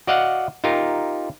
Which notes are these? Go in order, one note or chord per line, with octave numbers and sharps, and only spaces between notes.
F#4 D5 D#5 F5 F#5
D#4 F4 G4 A#4